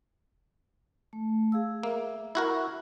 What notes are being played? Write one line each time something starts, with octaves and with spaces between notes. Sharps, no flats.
A3
G#4 F5 E6
A#3 E5
E4 F#4 A#4